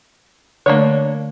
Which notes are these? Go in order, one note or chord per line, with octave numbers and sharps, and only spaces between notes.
D3 A3 A#3 D4 C#5